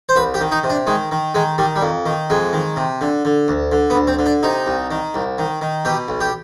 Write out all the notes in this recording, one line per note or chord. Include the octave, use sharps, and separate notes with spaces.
C5
C2 B4
G4
D#3
D#4
C3
D4
D#3 G#3
D#3
D#3 G#3
D#3 G3
G3
F2
D#3
F2 G#3
D#3
C3
D3
D3
D2
D3
B3
D2
C4
D3
D4
C3 D#4
C2
D#3
C2
D#3
D#3
B2 G4
B1
G4